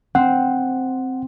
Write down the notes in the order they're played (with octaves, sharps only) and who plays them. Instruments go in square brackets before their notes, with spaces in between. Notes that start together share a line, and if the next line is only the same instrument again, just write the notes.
[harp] C4 [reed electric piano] F#5